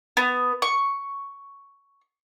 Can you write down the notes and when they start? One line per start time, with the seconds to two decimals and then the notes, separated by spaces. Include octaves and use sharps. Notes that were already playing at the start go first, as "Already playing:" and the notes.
0.17 B3
0.62 C#6